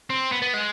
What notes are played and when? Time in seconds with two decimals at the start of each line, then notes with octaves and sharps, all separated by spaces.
0.10 C4
0.32 B3
0.42 B3
0.54 G#3